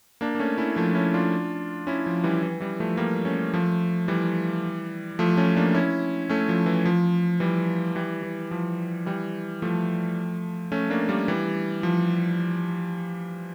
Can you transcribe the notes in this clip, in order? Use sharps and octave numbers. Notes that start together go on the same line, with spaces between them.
A#3 D4
A#3
A3 C#4
C#4 E4
F3 A3
C#4 E4
D4 F4
C#4 E4
F3
E3 G3
E3
E3 G3
F3 A3
G3 A#3
A3 C#4
F3 A3
E3 G3
F3 A3
A3 C#4
A#3 D4
C#4 E4
A3 C#4
F3
E3
F3
E3 G3
E3 G3
E3
F3
E3 G3
F3 A3
A3 C#4
A#3 D4
G3 A#3
E3 G3
F3